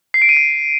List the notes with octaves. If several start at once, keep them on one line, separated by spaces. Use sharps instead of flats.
C7
D7
D#7
C7